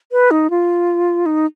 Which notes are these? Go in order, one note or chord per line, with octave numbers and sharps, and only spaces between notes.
B4
D#4
F4
D#4